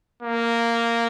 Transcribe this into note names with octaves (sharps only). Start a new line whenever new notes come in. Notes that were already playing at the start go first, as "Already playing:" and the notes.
A#3